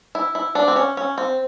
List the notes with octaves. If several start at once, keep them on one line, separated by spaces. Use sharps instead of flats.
E4
E4
D4
C4
C#4
C#4
C4